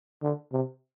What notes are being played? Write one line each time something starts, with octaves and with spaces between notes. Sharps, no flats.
D3
C3